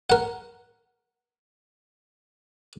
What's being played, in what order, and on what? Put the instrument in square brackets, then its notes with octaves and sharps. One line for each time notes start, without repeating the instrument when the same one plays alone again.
[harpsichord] A#4 F#5